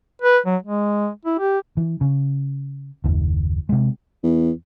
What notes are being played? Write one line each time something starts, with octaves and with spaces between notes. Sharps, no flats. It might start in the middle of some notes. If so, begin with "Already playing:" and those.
B4
F#3
G#3
E4
G4
E3
C#3
F#1 D#2
C3 G#3
E2